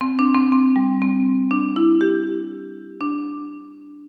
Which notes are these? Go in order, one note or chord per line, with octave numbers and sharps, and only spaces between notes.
C4
D4
C4
C4
G3
C4
D4
E4
G4
D4